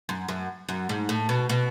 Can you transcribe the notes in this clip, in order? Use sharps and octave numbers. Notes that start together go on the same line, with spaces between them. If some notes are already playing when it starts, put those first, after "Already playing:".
F#2
F#2
F#2
G#2
A2
B2
B2